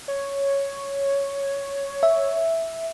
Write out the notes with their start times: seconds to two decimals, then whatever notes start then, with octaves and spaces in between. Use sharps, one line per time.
0.08 C#5
2.03 E5